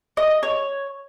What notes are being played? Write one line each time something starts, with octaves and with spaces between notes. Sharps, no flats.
D#5
C#5